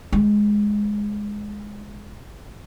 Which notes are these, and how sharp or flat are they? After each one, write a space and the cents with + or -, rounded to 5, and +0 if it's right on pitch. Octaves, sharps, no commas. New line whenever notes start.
G#3 +0